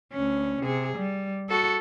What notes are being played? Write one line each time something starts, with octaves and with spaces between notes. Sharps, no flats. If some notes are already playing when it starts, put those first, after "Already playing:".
D2 C#4
C3 G#4
G3
F#4 A4